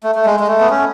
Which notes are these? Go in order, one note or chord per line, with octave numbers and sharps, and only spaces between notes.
A3
A3
G#3
G#3
A3
B3
C#4